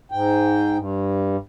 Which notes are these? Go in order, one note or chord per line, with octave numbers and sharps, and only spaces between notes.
G#2 G5
G2